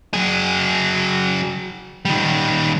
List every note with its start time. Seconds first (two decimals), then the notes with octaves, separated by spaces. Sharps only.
0.14 F#3 G#4
2.05 D#3 G3